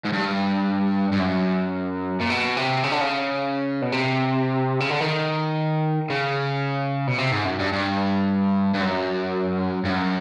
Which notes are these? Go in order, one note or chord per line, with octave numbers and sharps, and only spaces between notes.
G#2
G2
G2
F#2
A#2
B2
C3
C#3
D3
C#3
B2
C3
C#3
D3
D#3
C#3
B2
C3
G#2
F#2
G2
G2
G2
F#2
G2
F#2